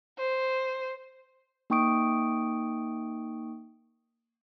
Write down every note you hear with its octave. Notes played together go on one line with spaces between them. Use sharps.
C5
A#3 D#4 G5 C#6 D#6 D7